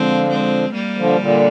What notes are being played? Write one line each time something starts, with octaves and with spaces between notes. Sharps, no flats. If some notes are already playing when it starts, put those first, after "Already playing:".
Already playing: D3 F3 G#3 C4
G#3 C4
G3 A#3
D3 F3
A#2 D3